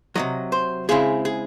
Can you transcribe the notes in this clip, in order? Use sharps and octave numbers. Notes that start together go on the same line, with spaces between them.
C3 D#3 F#3 D#5
C5
C#3 G#3 C4 E4 G#4
G#4